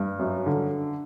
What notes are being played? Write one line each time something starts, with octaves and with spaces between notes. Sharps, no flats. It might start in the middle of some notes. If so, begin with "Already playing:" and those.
Already playing: G2
F#2
D3